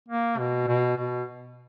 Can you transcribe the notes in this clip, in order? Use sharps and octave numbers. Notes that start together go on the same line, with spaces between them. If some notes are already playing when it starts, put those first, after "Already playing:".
A#3
B2
B2
B2